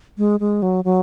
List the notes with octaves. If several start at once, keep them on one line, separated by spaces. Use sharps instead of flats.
G#3
G#3
F#3
F#3